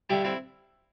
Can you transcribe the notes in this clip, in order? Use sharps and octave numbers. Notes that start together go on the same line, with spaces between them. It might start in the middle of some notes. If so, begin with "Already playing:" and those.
G2 D3 E4 G4
C4 E4